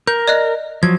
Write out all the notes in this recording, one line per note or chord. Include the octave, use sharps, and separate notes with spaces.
A#4 G6
D5 D#5 F#6
F3 F#3 G#6